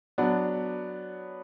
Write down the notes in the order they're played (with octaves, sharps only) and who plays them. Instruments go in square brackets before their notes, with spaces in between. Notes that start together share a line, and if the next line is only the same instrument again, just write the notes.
[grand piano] F#3 B3 D4